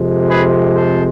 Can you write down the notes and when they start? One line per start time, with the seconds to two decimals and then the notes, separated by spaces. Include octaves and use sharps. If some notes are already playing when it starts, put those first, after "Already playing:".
Already playing: F2 C3 G#3
0.29 G#4 B4
0.75 A4 C5